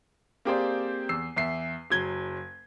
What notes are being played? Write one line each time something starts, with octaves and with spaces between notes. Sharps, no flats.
A#3 C4 G4 G#4 C5 D5
E2 E6 C7
E2 E5 C7
F#1 F#3 G#6 G7